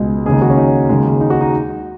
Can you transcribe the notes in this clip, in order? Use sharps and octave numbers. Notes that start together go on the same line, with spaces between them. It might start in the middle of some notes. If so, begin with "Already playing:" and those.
Already playing: C#2 B2 G#3
D#2 C#3 G#3 G#4
D#4
F#4
C#4
D#4
D#2 C#3 G#3
D#4
F#4
D#4